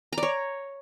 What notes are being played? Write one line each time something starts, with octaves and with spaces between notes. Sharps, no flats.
A#5
D5
C#5